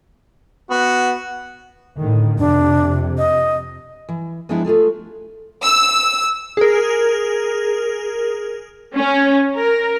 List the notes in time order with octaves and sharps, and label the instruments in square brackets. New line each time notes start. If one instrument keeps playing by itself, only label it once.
[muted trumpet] B3 [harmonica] F#4
[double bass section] A2 D3 D#3
[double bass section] F2 C3 [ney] D4
[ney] D#5
[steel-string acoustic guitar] E3
F3 G#3 B3 C4 D4 E4
A3 F4 G#4 A4
[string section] E6
[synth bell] G#4 A#4
[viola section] C#4
A#4